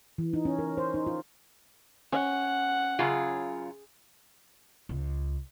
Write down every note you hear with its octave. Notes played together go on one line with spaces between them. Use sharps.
E3
D#4
C#4
A#4
C5
D#4
F4
C#4 F#5
F#2 C#3 F4 G#4
C#2